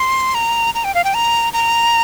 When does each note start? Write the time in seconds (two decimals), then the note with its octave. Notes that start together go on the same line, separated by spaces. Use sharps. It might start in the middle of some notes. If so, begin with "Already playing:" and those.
Already playing: C6
0.35 A#5
0.74 A#5
0.84 G5
0.94 F5
1.04 G5
1.14 A#5
1.53 A#5